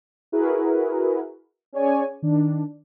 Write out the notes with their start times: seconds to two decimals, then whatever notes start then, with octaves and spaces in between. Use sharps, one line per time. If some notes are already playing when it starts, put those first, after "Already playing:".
0.32 E4 F#4 G#4 A#4 B4
1.73 C#4 G#4 C#5 D5 G#5
2.22 D#3 D4